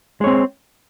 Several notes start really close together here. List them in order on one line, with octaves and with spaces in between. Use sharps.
G#3 C#5 C4